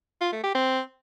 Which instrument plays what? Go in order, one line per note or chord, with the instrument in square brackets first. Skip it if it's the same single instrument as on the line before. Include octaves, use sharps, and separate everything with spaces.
[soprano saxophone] F4
A3
G4
C4